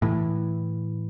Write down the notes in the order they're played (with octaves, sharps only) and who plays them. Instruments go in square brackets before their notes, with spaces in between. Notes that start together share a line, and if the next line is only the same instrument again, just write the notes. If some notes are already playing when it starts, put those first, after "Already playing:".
[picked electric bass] A2 E3